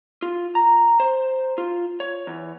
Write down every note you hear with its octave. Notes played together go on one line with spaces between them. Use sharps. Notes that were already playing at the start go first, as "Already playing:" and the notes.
F4
A#5
C5
F4
C#5
E2